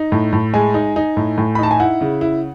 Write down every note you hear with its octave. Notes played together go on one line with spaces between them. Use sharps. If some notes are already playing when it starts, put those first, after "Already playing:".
Already playing: D#4
A2
A2
G#3 G#5
D#4
D#4
A2
A2
B5
D#4 A5
G#5
E4 F#5
C#3
E4